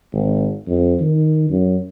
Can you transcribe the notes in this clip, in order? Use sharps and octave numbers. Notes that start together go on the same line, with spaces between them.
G#1
F2
D#3
F#2